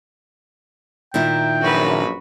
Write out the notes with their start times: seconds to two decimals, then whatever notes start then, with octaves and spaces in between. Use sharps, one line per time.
1.14 A#2 D#3 E4 G5
1.61 A#1 F#2 F#4 B4